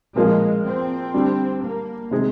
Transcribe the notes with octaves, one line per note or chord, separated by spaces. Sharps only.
A#2 F3 G#3 A#3 F4 G#4
C4
D3 G3 D4
A#3
C3 D#3 G#3 C4